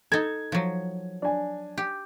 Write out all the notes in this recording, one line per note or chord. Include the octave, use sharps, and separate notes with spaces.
D#4 A4 G#6
F3 F#3
D4 G#5
G4